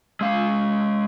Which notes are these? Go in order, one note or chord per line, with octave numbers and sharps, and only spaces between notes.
G#3 F5